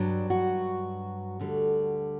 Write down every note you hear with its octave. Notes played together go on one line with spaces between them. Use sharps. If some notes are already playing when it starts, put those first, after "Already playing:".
Already playing: G2 F#3 D4
F#4
D2 D3 G3